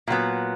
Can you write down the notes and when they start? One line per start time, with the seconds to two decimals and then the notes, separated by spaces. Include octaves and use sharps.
0.07 A#2 F#3 B3